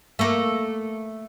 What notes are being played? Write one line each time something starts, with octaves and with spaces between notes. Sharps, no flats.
A3 A#3